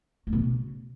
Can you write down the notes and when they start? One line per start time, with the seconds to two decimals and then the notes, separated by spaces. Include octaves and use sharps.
0.27 A3
0.33 B2
0.38 C#3